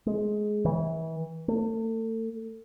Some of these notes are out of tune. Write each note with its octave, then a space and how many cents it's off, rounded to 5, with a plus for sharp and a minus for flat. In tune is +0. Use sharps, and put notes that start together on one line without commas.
G#3 +15
E3 -30
A3 +35